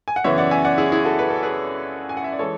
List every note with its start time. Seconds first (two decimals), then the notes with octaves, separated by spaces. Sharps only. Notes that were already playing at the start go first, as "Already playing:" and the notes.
0.08 G#5
0.16 F#5
0.24 F#2 C#3 E3 B3 C#5 E5
0.38 D5 F#5
0.51 E5 G#5
0.65 D5 F#5
0.78 E4 G#4
0.92 E4 G#4
1.05 F#4 A4
1.19 B4
1.30 A4
1.43 G#4 B4
2.09 G#5
2.17 F#5
2.24 E5
2.32 D5
2.39 E3 G#3 A4 C#5